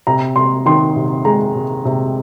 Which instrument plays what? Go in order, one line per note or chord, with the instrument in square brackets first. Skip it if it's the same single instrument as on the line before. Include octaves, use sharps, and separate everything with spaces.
[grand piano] C3 A#5
C3 C6
D#3 C6
C3
G#3 A#5
C3
C3